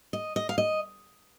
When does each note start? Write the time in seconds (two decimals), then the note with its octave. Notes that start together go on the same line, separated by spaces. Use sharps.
0.13 D#5
0.36 D#5
0.49 F5
0.58 D#5